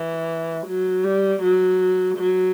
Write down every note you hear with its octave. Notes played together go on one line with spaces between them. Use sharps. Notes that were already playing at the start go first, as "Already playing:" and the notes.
Already playing: E3
F#3
G3
F#3
F#3